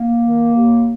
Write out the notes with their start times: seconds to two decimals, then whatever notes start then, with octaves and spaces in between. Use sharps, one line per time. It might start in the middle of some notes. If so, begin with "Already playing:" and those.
Already playing: A#3
0.22 D#3
0.53 D#2